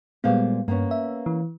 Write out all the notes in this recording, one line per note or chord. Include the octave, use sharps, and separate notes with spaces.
A#2 G3 G#3 B3 C5 F5
G2 A#3 B3 C#4
E5
E3